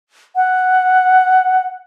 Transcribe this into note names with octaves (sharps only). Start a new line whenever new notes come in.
F#5